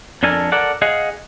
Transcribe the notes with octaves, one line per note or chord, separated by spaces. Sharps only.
F2 D4 A4 A#4 G#5
A4 A#4 D5 F#5
G#4 D#5 F5 F#5